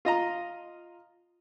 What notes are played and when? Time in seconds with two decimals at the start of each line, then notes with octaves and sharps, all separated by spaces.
0.05 F4 D#5 A#5